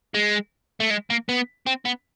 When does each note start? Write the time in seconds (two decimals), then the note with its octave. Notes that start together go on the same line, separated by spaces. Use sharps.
0.14 G#3
0.80 A3
0.90 G#3
1.10 A#3
1.29 B3
1.67 C4
1.85 B3